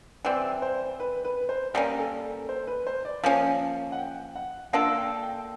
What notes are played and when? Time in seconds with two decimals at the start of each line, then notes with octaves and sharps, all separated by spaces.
0.25 E3 G3 C4 D5
0.62 C5
1.00 B4
1.25 B4
1.49 C5
1.74 G3 A#3 C#4 A#4
1.99 A4
2.49 C5
2.67 B4
2.87 C5
3.05 D5
3.24 F3 A#3 C#4 F5
3.92 F#5
3.98 G5
4.36 F#5
4.73 A#3 D4 F4 A4 F#5
4.98 G5
5.23 G5